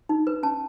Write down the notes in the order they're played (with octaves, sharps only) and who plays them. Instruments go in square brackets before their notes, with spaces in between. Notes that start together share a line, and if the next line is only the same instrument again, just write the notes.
[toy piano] D#4
B4
C#4 A5